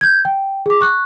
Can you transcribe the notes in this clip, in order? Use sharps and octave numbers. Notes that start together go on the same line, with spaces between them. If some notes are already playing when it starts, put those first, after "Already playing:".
G6 G#6
G5
G#4 D6
C#6 F#6